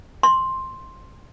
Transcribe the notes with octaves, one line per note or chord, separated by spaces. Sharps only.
C6